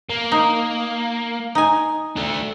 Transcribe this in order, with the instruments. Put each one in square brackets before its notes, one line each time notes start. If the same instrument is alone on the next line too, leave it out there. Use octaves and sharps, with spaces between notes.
[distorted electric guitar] A#3
[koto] D#4
D#4 G#5
[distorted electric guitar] A3 D4